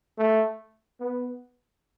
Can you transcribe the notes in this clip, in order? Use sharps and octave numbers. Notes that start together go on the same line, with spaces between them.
A3
B3